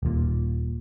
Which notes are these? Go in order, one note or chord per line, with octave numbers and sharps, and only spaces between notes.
D#1 A#2